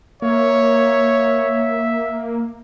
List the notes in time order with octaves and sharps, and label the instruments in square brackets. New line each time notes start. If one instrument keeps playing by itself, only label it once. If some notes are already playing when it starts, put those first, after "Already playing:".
[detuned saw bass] A#3 [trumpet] C#5 [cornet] E5